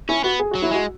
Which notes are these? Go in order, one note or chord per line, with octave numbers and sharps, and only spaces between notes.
C#4 E4
B3 F#4
G#4
F#3 F#4
E4
G#3 F#4